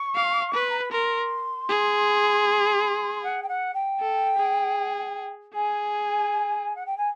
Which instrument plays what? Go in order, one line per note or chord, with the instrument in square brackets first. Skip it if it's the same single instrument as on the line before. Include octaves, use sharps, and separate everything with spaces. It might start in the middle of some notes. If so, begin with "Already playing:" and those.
Already playing: [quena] C#6
[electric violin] F5
B4
[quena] A#5
B5
[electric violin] A#4 [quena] C6
[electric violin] G#4
[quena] F#5
G5
F#5
G5
[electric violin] A4
G#4
[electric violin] G#4 [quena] G#5
[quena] F#5
G5
G#5